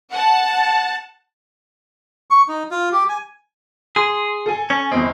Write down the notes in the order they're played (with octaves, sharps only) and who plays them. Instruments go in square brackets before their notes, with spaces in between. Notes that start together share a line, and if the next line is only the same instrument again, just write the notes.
[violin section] F#5 A5
[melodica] C#6
D#4
F4
G4
G#5
[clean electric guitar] G#4 [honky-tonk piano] C6
[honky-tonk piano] A4 G#5
[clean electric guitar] C#4
[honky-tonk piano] G1 E2 D#5 [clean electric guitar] C4